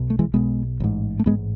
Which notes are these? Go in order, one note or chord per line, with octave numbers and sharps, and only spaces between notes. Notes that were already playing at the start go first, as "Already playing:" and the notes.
Already playing: B1 B2
A3
E3 G#3
B1 B2 G#3 B3
A1 G#2
A3
A1 G#2 G#3 B3